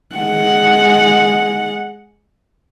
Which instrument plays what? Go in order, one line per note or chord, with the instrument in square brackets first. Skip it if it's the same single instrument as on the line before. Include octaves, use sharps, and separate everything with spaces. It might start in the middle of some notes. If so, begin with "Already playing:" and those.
[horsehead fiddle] G#3 F#5